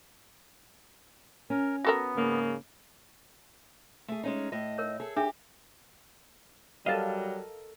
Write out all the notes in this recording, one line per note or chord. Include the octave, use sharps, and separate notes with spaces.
C#4 A#4
B3 F#4 A4 A#4
G#2 C#3 A#3
A3 G#4
G#3 C#4 D#4
A2 D#5
A#4 C#5
G#4 A4
D4 G4 G#4 E5
F#3 G3 A4 A#4 D#5 F5 A5